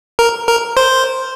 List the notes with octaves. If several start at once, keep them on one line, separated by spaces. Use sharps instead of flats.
A#4
A#4
C5